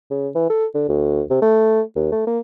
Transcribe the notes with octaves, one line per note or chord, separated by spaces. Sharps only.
C#3
E3
A4
D3
D2
C3
A3
D#2
A3
A#3